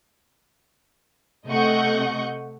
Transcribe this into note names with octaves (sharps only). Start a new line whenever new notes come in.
C3 A3 D#5 F#5 C#6 G6